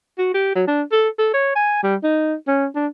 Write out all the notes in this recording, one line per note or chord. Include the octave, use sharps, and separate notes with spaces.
F#4
G4
F#3
D4
A4
A4
C#5
G#5
G3
D#4
C#4
D4